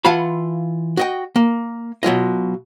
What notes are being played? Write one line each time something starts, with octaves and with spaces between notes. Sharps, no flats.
E3 F4 F5 F#5 A5 B5
F#4 D#5 G5
A#3
B2 F#3 F4 D#5